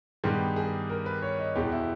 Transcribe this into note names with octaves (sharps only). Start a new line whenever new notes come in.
G2 D#3 G#3 B3 G4
G#4
A#4
B4
C#5
D#5
E2 B2 G#3 B3 G4
E4